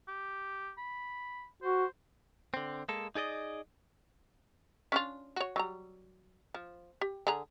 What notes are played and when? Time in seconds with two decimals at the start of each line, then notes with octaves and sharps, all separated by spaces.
0.08 G4
0.78 B5
1.62 F#4 C5
2.54 D3 C4
2.89 G#3 A#3 A4
3.15 D#4 G#4 D5 D#5
4.92 C#4 D4 F4
5.36 F#4 C#5
5.56 F#3 G3 A#5
6.54 F3
7.01 G4
7.27 D3 G#4 A#5